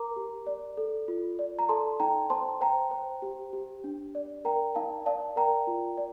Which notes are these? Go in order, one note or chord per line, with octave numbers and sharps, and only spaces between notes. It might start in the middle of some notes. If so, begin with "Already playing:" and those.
Already playing: A#4 A#5 D6
G4
D5
A4
F4
D5
A#5
A4 A5 C6
D#4 G5 A#5
C5 A5 C6
C5 G5 A#5
C5
G4
G4
D4
D5
A#4 G5 A#5
D#4 F5 A5
D5 F5 A5
A#4 G5 A#5
F4
D5